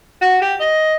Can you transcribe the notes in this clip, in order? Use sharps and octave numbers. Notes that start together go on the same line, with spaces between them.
F#4
G4
D#5